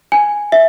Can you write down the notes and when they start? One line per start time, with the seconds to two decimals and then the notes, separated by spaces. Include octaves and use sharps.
0.12 G#5
0.52 E5